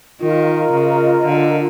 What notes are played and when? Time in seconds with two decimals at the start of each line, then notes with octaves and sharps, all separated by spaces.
0.20 D#3 F4 A#4 D#5
0.72 C#3
1.25 D3